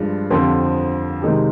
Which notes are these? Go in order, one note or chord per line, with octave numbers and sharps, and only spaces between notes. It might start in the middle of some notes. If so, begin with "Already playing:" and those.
Already playing: G2 F3 G#3 D4
F2 D3 F3 C4 G4
C3 D#3 G#3 D#4 G4